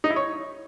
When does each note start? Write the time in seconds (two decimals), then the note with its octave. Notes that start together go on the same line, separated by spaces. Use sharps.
0.04 D#4
0.10 E4
0.16 C#5